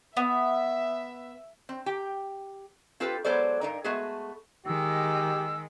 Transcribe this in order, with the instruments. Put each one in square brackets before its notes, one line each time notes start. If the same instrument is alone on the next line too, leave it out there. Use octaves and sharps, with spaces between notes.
[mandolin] B3 [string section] E5
[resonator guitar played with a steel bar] C4
G4 G5
C4 F4 G4 A4 B4
F#3 G#3 B3 A4 C5 D5
G2 D#4 A#4
G#3 A3 B3 F#4 G#4
[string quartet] D#3 G#3 [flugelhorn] G4 [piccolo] E6